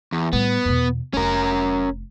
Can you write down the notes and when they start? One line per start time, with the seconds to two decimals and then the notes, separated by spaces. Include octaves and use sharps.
0.12 E2
0.33 A2 G3 B3
0.65 E2 B2
1.14 F1 C#4 F4 A#4